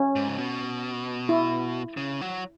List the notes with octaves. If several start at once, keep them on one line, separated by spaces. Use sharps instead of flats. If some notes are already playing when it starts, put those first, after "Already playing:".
Already playing: C#4
G#2
C#3
B2
E4
C#3
F#3